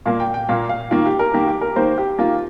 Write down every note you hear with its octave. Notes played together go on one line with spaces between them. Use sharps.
A#2 A#3 F5
G5
G5
A#2 A#3 F5
F5
D#3 A#3 F4
G4
A#4
D#3 A#3 G4
G4
A#4
D#3 A#3 C5
G4
D#3 A#3 F4